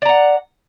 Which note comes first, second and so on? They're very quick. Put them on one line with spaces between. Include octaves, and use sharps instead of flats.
D5 A#5 F#5